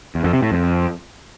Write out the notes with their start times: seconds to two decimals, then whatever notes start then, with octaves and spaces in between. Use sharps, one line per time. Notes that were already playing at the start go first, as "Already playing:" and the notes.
0.15 E2
0.24 F2
0.33 C3
0.42 A2
0.52 F2